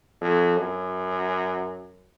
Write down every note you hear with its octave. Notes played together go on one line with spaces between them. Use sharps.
F2
F#2